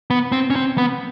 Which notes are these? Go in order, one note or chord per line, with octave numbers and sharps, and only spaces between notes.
B3
C4
C#4
C4
B3